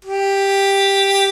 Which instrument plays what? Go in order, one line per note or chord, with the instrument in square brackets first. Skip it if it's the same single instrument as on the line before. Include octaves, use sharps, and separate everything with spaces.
[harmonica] G4